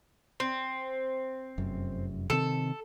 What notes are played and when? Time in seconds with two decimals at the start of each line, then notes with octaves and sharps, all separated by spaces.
0.40 C4
1.58 F1 F#2
2.30 C3 D#3 C4 A4